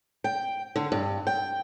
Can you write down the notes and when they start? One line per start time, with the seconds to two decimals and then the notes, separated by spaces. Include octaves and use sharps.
0.24 G5
0.76 D3
0.92 G2
1.27 G5